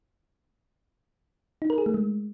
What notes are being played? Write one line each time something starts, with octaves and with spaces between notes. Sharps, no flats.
D#4
A#4
G#4
A3
G#3